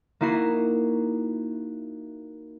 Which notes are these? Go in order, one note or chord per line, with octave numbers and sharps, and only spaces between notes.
A#3 D#4 E4 F#4 C7